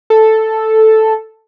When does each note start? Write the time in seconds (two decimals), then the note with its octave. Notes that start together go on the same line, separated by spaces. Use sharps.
0.10 A4